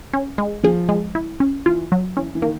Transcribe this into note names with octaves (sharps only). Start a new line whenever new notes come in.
C#4
G#3
F3 G#4
G#3
E4
C#4
E3 F4
F#3
E3 C#4
E3
D#3 A#3